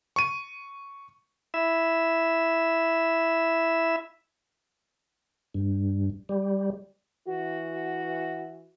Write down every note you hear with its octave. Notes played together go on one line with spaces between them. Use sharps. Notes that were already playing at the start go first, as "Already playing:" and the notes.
C#6 D#7
E4 E5
G2
G3
E3 F#4